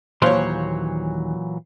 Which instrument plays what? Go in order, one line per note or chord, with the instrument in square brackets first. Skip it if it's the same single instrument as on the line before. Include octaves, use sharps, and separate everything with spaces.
[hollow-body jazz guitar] D#2 F5 C6 [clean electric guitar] A#2 E3 F#3 [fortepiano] C5 C#5